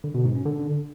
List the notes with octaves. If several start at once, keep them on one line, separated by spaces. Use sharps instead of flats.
D3
B2
G#2
C#4
D3